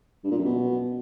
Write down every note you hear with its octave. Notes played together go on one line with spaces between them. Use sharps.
G2
A#2
F#2
B2